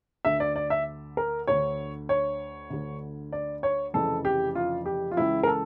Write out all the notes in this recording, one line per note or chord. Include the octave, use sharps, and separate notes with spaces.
D2 D3 E5
D5
D5
E5
A#4
D2 D3 C#5
C#5
D2 D3
D5
C#5
F1 F2 C#3 E3 A4
G4
F4
G4
F4
C#2 C#3 E3 E4
A#4
A4